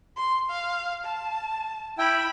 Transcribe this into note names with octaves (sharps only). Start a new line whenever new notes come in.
C6
F5
A5
E4 E5 G5 B5